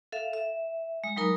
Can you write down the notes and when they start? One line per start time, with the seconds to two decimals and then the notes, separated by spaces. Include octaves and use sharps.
0.12 A4 E5 F5
0.33 E5
1.04 G#3
1.16 F#3 G#3 D#4 A#4 A#5 B5